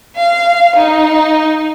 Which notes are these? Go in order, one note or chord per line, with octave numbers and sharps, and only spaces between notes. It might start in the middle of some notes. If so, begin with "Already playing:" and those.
F5
D#4